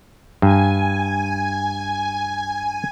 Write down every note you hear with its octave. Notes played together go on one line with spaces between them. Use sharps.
G2 G#5